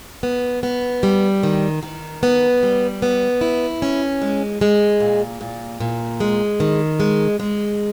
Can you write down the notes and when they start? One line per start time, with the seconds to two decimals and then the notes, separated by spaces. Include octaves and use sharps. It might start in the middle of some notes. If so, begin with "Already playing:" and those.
0.23 B3
0.63 B3
1.03 G3
1.43 D#3
1.83 D#3
2.23 B3
2.63 G3
3.02 B3
3.41 E4
3.82 C#4
4.22 G#3
4.61 G#3
5.00 A#2
5.41 A#2
5.80 A#2
6.20 G#3
6.60 D#3
7.00 G#3
7.40 G#3